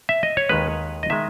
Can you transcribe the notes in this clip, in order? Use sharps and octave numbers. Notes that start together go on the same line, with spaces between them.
E5
D#5
C#5
D#2 D#3 G#3 B4
D#5
D#3 G#3 E5